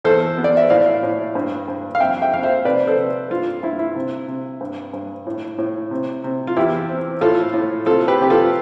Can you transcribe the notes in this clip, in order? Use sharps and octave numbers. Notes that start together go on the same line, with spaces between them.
E2 A4 C5
B3
D5
E5
A2 D5 F5
A2
G2
G2
F5
F2 E5 G5
E5 G5
F2 F5
C5 E5
C3 B4 D5
A4 C5
C3
G2 F4
G2 E4
E4
C3
C3
G2
G2
A2
A2
C3
C3
F4
E2 E4 G4
C4
A2 F4 A4
A2
C3 F4 A4
G4 B4
C3 G4
F4 A4